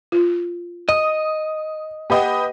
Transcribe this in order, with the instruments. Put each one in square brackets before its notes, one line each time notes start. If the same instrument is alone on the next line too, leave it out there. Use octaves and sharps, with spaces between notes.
[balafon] F4
[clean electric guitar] D#5 [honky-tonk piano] D#6
[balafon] A#3 F#5 G5 [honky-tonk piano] G4 B4 D#5